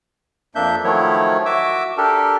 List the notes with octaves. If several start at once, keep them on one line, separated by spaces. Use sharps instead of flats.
F2 A#3 D4 E5 G6
D#3 F3 F#3 A3 E4 C#5
F#4 E5 D6 E6
D4 G4 A4 A#4